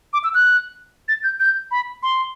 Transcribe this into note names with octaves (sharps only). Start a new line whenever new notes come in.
D6
E6
F#6
A6
G6
G6
B5
C6